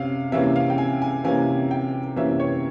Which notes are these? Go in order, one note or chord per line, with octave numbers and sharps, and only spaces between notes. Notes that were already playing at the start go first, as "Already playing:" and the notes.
Already playing: C3 C#4 F5
C3 E3 A#3 C#4 E5
F5
G5
G#5
G#5
C3 E3 A#3 C#4 G#5
G5
C3 E3 A#3 C#4 E5
C#5